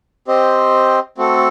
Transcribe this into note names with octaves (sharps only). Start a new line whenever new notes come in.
C4 G4 C5 D#5
A3 C4 F#4 A4